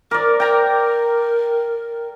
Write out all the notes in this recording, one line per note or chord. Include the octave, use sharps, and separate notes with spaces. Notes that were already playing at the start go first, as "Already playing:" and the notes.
A#4 D5 D6
A#4 G5 A#5